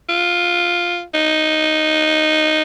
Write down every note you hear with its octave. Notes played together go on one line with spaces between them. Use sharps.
F4
D#4